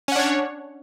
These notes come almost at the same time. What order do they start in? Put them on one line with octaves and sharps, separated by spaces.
C#4 F#5 D4 C#5